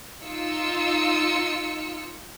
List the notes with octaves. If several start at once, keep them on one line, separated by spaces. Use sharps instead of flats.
D#4 F4 E6 C#7